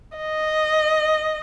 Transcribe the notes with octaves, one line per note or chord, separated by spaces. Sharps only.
D#5